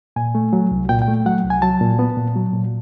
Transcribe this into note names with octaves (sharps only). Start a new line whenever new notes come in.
A#2 G#5
A3
F#3
C2
A#2 G5
G5
A3
F#3 F#5
C2
G#5
F#3 A5
A#2
B3
A#2
F#3
A#2